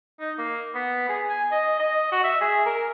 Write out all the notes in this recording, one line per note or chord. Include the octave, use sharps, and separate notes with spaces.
D#4
A#3
B3
G#4
G#5
D#5
D#5
F#4
E5
G#4
A#4